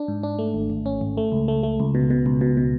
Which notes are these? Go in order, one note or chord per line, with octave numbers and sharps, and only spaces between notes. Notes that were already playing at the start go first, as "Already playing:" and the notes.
Already playing: D4
G#2
D4
A3
G#1
G#1
C#4
G#1
A3
C#2
A3
A3
C#2
B2
B2
C#2
B2
B2